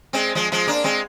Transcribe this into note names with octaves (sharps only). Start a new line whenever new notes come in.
G#3 C4
F3 G#3
F3 G#3
A#3 D4
G#3 C4